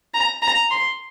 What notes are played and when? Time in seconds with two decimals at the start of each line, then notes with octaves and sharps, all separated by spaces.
0.14 A#5
0.42 A#5
0.71 C6